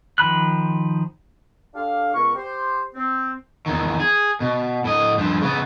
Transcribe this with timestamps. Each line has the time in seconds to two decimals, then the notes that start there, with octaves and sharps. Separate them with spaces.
0.18 D#3 F3 B5 F#6
1.74 D4 G4 A4 F5
2.14 C#2 B3 A#4 C#6
2.35 G4 C5
2.95 C4
3.66 E2 D#3
4.00 G#4
4.40 B2
4.84 A2 D#5
5.17 G2 F3
5.41 C#3 B3